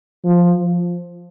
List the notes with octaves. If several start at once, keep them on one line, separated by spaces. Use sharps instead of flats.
F3